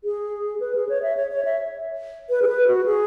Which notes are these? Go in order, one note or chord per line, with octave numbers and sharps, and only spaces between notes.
G#4
B4
G#4
C#5
E5
C#5
C#5
E5
B4
G#4
B4
F#4
G#4